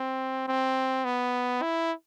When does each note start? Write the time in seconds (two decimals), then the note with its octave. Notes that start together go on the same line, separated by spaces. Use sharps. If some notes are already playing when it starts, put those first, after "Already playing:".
Already playing: C4
0.48 C4
1.05 B3
1.62 E4